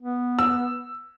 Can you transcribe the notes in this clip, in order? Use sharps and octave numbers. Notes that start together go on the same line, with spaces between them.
B3
E6